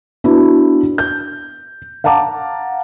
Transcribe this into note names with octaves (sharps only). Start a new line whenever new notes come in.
B3 D4 E4 F#4
G6
F5 F#5 A5 A#5 D6